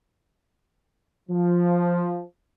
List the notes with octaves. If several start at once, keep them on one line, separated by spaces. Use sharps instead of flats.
F3